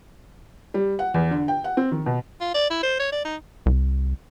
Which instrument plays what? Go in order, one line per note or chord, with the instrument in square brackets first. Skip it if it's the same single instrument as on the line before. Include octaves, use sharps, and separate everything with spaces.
[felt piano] G3
F#5
E2
D3
G5
F#5
C4
D#3
B2
[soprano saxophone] F4
D5
E4
C5
C#5
D5
D#4
[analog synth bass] C2